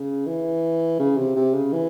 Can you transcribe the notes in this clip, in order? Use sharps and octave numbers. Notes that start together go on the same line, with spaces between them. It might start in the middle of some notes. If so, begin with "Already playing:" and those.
Already playing: C#3
E3
C#3
C3
C3
C#3
E3